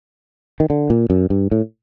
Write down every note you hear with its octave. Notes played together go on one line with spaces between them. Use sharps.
D#3
D3
A#2
F#2
G2
A2